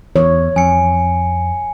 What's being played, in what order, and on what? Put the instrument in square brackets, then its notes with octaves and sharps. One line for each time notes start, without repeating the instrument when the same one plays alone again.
[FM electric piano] E2 [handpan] C#5
[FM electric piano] F2 [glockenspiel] G#5 C#7